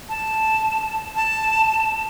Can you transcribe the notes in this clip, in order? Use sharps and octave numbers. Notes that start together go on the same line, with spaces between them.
A5
A5